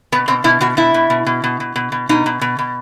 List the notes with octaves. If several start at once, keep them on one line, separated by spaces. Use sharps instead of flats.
B2 B3
B2 C4
B2 E4
B2 F#4
B2 E4
B2
B2
B2
B2
B2
B2
B2
B2 D#4
B2
B2
B2